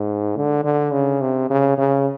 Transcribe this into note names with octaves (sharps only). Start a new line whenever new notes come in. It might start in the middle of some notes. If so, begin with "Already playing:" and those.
Already playing: G#2
D3
D3
C#3
C3
C#3
C#3